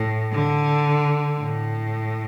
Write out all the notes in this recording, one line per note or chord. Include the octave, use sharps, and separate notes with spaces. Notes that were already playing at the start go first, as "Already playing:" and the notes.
Already playing: A2
D3
A2